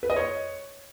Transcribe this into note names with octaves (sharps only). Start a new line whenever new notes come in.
B4
D#5
C#5